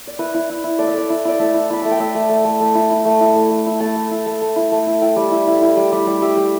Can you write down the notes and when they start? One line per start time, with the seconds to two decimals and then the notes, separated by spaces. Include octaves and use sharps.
0.07 D5
0.19 E4 B4
0.34 E4
0.49 E4
0.64 E4
0.79 A3 D5
0.88 E5
0.94 A3 D5
1.10 E4
1.25 E4 D5
1.39 A3 E5
1.54 E4
1.70 E4 B5
1.82 A3 A5
1.91 G5
1.99 A3 E5
2.15 A3
2.29 A3
2.45 A3
2.60 A3
2.75 E4
2.90 E4
3.05 A3
3.21 E4
3.36 A3
3.51 A3
3.66 E4
3.80 A3 A5
3.96 A3
4.11 E4
4.26 A3
4.41 A3
4.56 E4
4.72 A3
4.87 E4
5.01 E4 G5
5.16 G3
5.31 E4
5.47 E4
5.61 E4
5.76 G3
5.92 G3
6.07 G3
6.22 G3 E5
6.36 G3